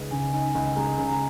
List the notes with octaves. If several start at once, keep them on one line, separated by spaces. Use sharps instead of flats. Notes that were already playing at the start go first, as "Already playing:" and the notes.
Already playing: C#2 C#3 G#3 D#4 B4
C#3 G#5
D#4 G#5
C#2 G#5
G#3 A#5
C#3 G#5
A#5